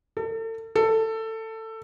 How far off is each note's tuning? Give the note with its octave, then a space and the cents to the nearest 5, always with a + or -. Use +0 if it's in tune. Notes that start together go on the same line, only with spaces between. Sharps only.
A4 +35
A4 +15